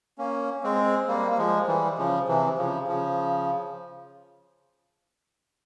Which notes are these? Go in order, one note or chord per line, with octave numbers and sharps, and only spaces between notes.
A#3 C#4
G#3 C4
G3 A#3
A#3
F3 G#3
E3 G3
C#3 F3
C3 E3
C#3 F3
C#3 F3